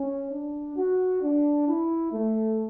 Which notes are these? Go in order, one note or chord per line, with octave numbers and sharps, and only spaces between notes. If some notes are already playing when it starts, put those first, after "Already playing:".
Already playing: C#4
D4
F#4
D4
E4
A3